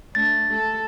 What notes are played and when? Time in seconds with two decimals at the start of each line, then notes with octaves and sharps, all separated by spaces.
0.15 A3 D4 A6
0.53 A4